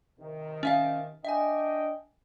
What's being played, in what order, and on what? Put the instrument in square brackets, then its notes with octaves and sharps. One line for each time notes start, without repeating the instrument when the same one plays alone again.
[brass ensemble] C3 D#3
[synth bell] C#4 E5 F5
[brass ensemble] D4 D#5 G5 [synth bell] E5 G#5